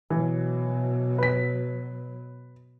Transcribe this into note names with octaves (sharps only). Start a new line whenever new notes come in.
B2 E3 F#3
B4 B6